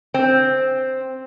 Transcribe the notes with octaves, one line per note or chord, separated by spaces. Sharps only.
C4